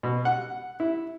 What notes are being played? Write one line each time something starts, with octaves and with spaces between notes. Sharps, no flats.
B2
F#5
E4